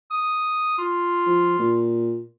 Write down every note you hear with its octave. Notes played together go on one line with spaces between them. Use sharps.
D#6
F4
F3
A#2